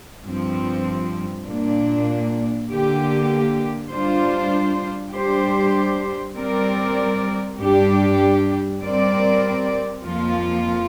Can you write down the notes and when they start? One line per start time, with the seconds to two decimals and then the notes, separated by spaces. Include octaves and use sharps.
0.24 G2 F3 C4
1.47 A#2 A#3 D4
2.69 D3 A#3 G4
3.91 G3 D4 F4 C5
5.13 G3 D4 G4 C5
6.35 G3 C4 A#4 D5
7.57 G2 G3 D4 G4
8.80 G3 C4 A#4 D5
10.01 F2 F3 A#3 F4